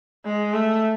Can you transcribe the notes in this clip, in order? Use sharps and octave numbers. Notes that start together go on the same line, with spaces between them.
G#3
A3